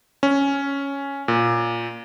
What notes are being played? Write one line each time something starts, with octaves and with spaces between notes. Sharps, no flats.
C#4
A#2